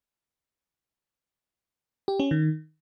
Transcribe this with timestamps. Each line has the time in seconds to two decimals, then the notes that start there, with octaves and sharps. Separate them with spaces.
2.08 G4
2.20 C#4
2.31 D#3